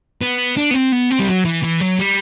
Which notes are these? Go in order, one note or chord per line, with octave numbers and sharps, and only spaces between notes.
B3
D4
B3
C4
B3
C4
G3
F#3
E3
E3
F#3
G3